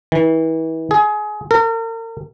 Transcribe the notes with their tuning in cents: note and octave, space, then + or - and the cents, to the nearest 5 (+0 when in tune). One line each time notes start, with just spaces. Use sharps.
E3 -35
G#4 +25
A#4 -40